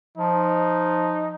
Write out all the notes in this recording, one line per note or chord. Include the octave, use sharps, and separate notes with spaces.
F3 D#4